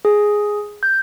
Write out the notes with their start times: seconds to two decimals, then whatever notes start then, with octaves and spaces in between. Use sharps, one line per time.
0.05 G#4
0.83 G6